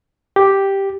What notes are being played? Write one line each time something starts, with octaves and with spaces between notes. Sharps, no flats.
G4